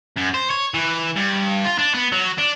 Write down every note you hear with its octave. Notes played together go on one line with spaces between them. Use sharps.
F#2
C5
C#5
E3
G2
F4
D4
B3
F#3
D4